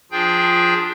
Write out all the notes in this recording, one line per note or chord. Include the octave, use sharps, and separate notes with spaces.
F3 D4 F4 G#4 G5 G6